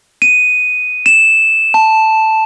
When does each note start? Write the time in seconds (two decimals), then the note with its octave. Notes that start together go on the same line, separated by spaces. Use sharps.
0.22 D#7
1.06 E7
1.74 A5